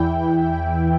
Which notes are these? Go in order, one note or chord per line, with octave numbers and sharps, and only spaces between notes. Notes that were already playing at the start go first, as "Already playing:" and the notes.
Already playing: E2 E3 E4 G5